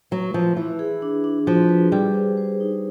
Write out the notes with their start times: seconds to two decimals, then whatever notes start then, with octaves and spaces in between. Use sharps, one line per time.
0.11 F#3 B4
0.34 F3 B4
0.57 E3 E4
0.79 G#4
1.02 D4
1.24 D4
1.47 F3 F#4
1.69 B4
1.92 G3 G#4
2.14 C5
2.37 C5
2.60 D#4